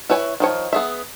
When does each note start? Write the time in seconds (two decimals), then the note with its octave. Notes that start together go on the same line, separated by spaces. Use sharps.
0.10 E4 B4 C#5 G#5
0.40 D#3 F3 C#5
0.73 B3 G#4 E5